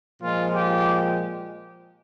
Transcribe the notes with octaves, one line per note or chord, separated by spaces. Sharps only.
A#2 F3 G#3 F4
G4